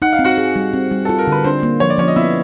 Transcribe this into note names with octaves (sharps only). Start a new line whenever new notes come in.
D#4 F#5
F5
C4
F#4 F#5
G#4
G3
C4
G3
F4 A4
A#4
D3 B4
C4 D4 C5
A#3
F3 C#5
D5
F3 C#4 C#5
D#5
B3 E4 E5